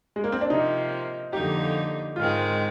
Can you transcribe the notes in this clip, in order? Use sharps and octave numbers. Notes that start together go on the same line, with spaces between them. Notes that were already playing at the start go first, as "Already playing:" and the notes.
G#3
A#3
C4
D4
C3 F3 A#3 D#4
F2 D3 G3 A#3 D#4 G4
G#2 D#3 G#3 C4 F4